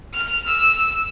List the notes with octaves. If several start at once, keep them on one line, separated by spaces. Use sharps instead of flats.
F6
E6